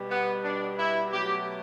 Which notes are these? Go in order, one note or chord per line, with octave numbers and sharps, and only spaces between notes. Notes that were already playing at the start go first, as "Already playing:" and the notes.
Already playing: B2 G3
B3
D4
E4
B2 F#3 A3 G4